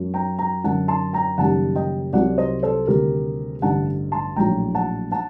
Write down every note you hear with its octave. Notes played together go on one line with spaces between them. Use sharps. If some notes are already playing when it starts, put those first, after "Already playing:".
Already playing: F#2 F#3
G5 A#5
G5 A#5
F#2 D3 F#3 F#5 A5
A5 C6
G5 A#5
F#1 F#2 D#3 G3 F#5 A5
D#5 G5
C2 C3 F#3 D5 F#5
C5 D#5
A4 C5
D2 C3 D#3 G3 G4 A#4
A1 G2 D3 F#5 A5
A5 C6
A#1 A2 F#3 G5 A#5
F#5 A5
F#5 A5